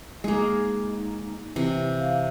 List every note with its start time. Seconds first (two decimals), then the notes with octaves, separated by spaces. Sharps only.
0.24 G#3 A#3 D#4 G#4
1.56 C3 E3
2.00 F5